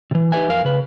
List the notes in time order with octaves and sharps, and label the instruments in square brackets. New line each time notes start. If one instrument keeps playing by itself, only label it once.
[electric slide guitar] C3 E3
D#4 G4 A#4 B4 E5 G#5
F2 A#4 F5
C#3 B4